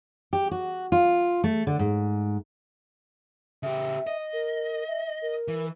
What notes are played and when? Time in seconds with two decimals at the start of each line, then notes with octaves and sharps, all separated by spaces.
0.33 G4
0.51 F#4
0.92 F4
1.44 A3
1.67 D3
1.79 G#2
3.63 C#3 G4 E5
4.07 D#5
4.33 A#4
4.88 E5
5.22 A#4
5.48 E3